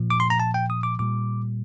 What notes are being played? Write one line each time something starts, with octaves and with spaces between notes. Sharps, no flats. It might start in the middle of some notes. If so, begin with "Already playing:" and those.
Already playing: A#2 F3
D6
C6
A#5
A5
G5
D#6
D6
A#2 G3 D6